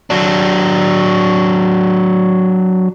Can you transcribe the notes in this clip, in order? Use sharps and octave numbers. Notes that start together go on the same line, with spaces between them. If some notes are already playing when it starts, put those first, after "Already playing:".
F#3 D4